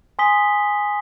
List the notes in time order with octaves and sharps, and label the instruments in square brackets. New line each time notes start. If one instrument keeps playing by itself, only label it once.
[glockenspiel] G#5 C6 D#6 B6 G7